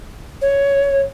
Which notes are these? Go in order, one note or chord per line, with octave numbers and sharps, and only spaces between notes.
C#5